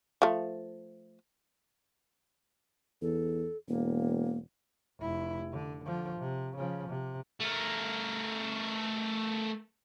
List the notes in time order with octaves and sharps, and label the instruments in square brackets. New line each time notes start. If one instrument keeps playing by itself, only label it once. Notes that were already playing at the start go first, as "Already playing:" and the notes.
[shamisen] F3 A3
[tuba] E2 [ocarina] A4
[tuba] E1 [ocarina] A#3
[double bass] F1 E4
D3
D3 F3
C3
C#3 F3
C3
[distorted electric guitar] A3 A#4